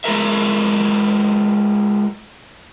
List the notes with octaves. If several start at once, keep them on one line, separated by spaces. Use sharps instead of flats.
G#3 F4 A4 A#4 E5